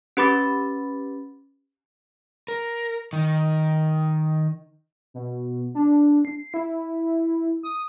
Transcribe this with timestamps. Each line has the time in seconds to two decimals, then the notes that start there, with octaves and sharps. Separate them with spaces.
0.17 C#4 G4 B4 B5 D6 A6
2.48 A#4
3.13 D#3
5.14 B2
5.75 D4
6.25 C7
6.54 E4
7.63 D#6